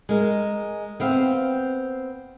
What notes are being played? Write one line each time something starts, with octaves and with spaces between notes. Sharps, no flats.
G#3 A#4
B3 C4 F5